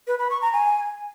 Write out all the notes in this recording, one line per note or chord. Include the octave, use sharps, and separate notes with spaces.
B4
B5
C#6
A#5
G#5